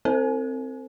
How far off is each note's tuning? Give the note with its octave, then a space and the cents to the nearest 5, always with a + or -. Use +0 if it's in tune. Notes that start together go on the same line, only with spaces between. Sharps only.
C4 +0 A4 +45 C5 +0